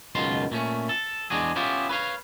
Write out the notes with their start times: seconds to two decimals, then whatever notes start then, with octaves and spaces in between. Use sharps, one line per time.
0.15 C#2 F#2 B2 D#3 F4 C6
0.51 A#2 A3 C#4
0.89 A4
1.30 E2 G#3 D4 F#4 G#4
1.56 B3 C#4 E4 F4 G4
1.89 B4 C#5 F5